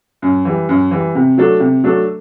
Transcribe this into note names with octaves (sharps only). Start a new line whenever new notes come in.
F#2
E3 G3
F#2
E3 G3
C3
F#3 A3 D4 A4
C3
F#3 A3 D4 A4